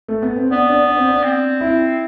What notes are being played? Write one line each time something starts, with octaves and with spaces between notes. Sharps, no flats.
A3
B3
C4
B3 D4
D4
D4
C4
D4
C4
E4